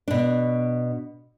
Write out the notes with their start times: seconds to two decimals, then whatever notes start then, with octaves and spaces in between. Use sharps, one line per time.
0.08 B2 D4